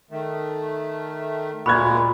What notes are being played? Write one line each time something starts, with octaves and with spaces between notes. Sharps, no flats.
D#3 A3
D2 A#2 G#3 A#3 B5 C#6 F#6 G#6